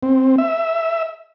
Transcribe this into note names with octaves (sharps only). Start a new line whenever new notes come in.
C4
E5